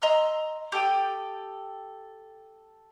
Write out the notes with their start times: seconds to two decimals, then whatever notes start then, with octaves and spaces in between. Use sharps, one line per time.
0.02 D#5 A#5 C6 E6
0.72 G4 A4 G5 D#6